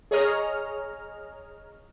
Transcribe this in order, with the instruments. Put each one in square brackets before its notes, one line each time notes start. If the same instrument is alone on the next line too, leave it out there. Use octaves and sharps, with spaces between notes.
[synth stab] G#4 C#5 D#5 A#5 F6